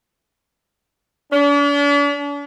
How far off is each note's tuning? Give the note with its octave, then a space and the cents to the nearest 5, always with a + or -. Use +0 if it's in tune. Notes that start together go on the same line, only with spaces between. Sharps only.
D4 -45